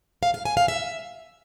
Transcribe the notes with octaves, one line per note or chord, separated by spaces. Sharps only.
F5
F5
G#5
F5
E5